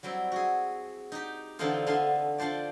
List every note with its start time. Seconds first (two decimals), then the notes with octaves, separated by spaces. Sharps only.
0.03 F#3 G3 C4 E4
0.32 F#4 G#4
1.12 D#4 G4
1.59 D3 E3 F3 C4 D#4 F4
1.87 D3 A3 B3 F5 G#5 C6
2.38 F3 D4 C5 D5